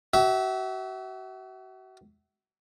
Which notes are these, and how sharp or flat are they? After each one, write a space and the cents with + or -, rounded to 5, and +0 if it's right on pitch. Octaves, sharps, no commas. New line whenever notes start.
F#4 +35 E5 -15